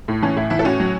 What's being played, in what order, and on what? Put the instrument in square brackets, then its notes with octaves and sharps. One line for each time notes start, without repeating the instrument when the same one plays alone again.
[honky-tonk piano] A2
E3 C#4
A2 E4
E3 E4
A4
A2 C#4 F#4
F#3